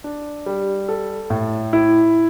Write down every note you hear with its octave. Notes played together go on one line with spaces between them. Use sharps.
D4
G3
A4
A2
E4